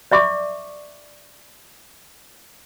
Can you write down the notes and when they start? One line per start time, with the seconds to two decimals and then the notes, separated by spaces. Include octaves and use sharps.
0.12 D5 E5 C#6 D6